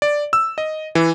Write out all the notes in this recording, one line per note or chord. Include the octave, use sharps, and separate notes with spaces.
D5
E6
D#5
E3